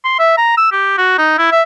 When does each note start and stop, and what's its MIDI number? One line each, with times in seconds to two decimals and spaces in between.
0.05 0.17 84
0.19 0.35 76
0.37 0.53 82
0.57 0.70 88
0.72 0.93 67
0.98 1.14 66
1.18 1.37 63
1.38 1.47 64
1.51 1.62 76